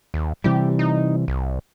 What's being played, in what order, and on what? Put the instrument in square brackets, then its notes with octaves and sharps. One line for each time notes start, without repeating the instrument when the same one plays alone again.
[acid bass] D#2
[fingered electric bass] C3 E3 G3 [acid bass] G4
[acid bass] D#4
C2